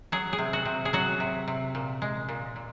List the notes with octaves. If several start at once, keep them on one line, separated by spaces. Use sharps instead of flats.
F#3 G#4
G#4
C3
F#4
C3
G#4
F#3 F#4
C3
C3
A#2
G#3
A#2
A#2